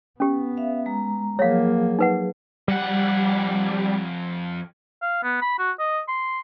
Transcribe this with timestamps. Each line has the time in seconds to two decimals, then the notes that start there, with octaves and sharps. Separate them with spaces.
0.20 B3 C#4 G4
0.57 E5 F5
0.86 G#3 A#5
1.39 F3 F#3 A#3 G#4 C#5 F5
1.99 D#4 B4 F#5
2.68 F2 G3 F#5
5.02 F5
5.23 B3
5.42 B5
5.58 F#4
5.79 D#5
6.08 C6